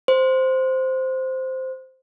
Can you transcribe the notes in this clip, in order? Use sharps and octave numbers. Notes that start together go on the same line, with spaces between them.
C5